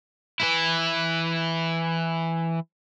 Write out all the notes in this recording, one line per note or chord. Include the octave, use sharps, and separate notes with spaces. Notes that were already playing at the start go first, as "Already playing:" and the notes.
E3 E4